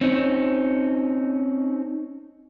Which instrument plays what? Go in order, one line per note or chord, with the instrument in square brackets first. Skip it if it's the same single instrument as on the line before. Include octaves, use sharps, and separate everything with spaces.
[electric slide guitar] C4 C#4 D#4